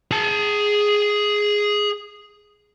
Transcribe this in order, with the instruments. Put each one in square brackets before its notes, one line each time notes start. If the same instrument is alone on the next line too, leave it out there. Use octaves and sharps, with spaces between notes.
[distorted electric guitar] G#4 A5